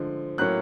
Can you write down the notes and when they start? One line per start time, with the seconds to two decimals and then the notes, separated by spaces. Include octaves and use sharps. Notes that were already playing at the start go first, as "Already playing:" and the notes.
Already playing: D3 F3 G#3
0.38 A2 F#3 A#3 C#4 F#6